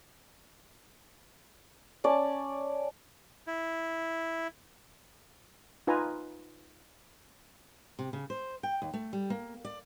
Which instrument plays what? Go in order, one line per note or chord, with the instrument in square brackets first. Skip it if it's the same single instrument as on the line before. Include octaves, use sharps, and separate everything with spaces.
[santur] C#4 D5 A5
[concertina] E4
[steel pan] D#4 F4 B4 G#5 A#5
[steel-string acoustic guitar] C3
C#3
C5
G5
D#2
A3
G3
A#3
D5